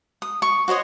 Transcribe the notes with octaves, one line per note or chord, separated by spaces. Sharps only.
D#6
C#6
F#4 C5 C#5 D#5